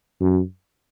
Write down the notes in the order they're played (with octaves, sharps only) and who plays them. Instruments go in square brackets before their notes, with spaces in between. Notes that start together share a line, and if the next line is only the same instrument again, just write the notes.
[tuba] F#2